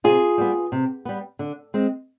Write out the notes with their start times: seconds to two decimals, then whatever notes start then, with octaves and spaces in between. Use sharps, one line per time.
0.04 C3 F4 G#4
0.38 G3 B3
0.72 C3
1.05 G3 B3
1.39 D3
1.74 G#3 C4